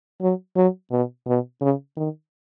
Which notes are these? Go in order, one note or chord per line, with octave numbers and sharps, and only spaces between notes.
F#3
F#3
B2
B2
C#3
D#3